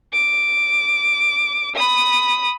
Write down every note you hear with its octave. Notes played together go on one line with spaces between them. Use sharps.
D6
B5 D#6